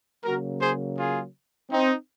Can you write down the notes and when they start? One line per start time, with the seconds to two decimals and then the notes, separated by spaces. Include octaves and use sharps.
0.24 C#3 F#3 A#3 F#4 A#4
0.61 G#4 C5
0.97 F4 G#4
1.70 C4 D#4